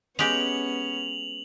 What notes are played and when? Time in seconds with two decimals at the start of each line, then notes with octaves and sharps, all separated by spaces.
0.19 G#3 B3 C#4 G4 F7 F#7